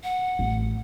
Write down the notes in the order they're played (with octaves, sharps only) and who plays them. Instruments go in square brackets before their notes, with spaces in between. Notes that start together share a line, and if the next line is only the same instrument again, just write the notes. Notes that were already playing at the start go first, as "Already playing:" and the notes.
[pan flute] F#5
[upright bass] A1